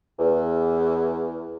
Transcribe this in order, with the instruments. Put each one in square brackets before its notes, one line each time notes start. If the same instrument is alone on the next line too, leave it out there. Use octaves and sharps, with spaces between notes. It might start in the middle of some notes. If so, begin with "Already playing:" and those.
[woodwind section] E2